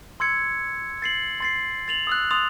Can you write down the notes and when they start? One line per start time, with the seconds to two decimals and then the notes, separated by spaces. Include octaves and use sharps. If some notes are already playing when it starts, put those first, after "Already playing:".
0.20 C6 E6 G#6 C#7
1.02 A6 C7 F#7
1.40 C6 A6 C7
1.88 A6 F7 F#7
2.07 D#6 E6 F#6
2.31 C6 D#6 F#6 A6 F7